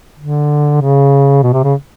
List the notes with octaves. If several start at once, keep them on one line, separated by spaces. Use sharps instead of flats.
D3
C#3
B2
C3
C#3